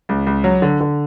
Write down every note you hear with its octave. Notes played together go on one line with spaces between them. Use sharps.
C#2
C#2
F#3
D3
D3